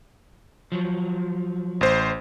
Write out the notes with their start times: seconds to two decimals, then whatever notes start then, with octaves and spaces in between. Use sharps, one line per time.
0.72 F3 F#3
1.81 A1 C5